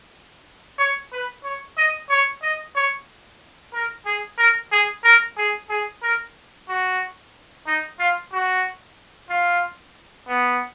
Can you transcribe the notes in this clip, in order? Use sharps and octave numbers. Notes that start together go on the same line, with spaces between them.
C#5
B4
C#5
D#5
C#5
D#5
C#5
A#4
G#4
A#4
G#4
A#4
G#4
G#4
A#4
F#4
D#4
F4
F#4
F4
B3